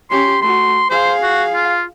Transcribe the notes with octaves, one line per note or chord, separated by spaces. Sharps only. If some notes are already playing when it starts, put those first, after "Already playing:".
C#4 G4 C6
A3 F#4 C6
G#4 C5 F5
F#4
F4